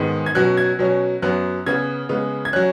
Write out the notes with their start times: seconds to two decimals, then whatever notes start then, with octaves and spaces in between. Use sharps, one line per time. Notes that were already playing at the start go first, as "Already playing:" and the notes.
Already playing: G#2 D#3 G#3 B3
0.26 G#6
0.35 B2 F#3 C#4 F#6
0.57 G#6
0.79 B2 F#3 C#4
1.22 F#2 F#3 B3 F#6
1.66 C#3 B3 G#6
2.09 C#3 G#3 B3
2.45 G#6
2.53 F#3 C#4 F#6